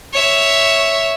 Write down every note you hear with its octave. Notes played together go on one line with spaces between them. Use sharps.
C#5 E5